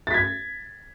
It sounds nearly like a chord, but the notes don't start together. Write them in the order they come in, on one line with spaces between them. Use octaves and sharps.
A6 B6 G#6